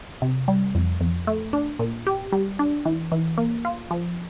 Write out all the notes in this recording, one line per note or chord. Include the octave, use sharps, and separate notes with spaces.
C3
G3
F2
F2
A3
D4
A#2
G4
G3
D4
E3
E3
A#3
F4
F3